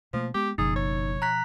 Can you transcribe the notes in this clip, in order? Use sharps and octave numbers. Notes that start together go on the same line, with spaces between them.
B2 F3 A3 A#3
G#3 B3 G4
F#1 B2 F3 D#4 G#4
C#5
A#5 F#6 B6